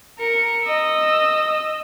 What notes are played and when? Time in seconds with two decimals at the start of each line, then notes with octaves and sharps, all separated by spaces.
0.19 A#4 C#7
0.65 D#5 E6